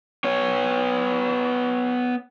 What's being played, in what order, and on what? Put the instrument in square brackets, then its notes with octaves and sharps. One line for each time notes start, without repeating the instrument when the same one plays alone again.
[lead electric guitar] B3 C#5